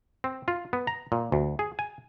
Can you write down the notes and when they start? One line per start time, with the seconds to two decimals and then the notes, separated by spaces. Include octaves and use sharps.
0.24 C4
0.48 F4
0.73 B3
0.87 A#5
1.12 A#2
1.32 D2
1.59 G#4
1.79 G#5